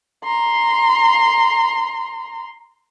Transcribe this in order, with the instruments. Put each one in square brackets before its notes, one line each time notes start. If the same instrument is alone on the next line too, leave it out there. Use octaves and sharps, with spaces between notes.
[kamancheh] A#5 C6